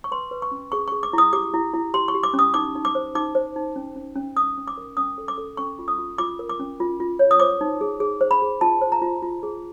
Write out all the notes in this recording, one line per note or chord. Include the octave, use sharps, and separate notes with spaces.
C#6
B4 C6
B4
C#6
C#4
G#4 C#6
G#4 C#6
D6
E4 D#6
G4 D6
E4
E4
G4 C6
C#6
G4
D6
C#4
D#6
D#4 D6
D#4
D6
C5
D#4 D6
C5
D#4
C#4
C#4
C#4
C#4 D#6
C#4
D6
A#4
C#4 D#6
A4
D6
A4
C#4 C#6
F4
D#6
F4
F4 D6
A#4
D6
C#4
F4
F4
C#5
D#6
C5 D6
D#4
G#4
G#4
C5
B5
G#4
F4 A5
C5
A#5
F4
F4
G#4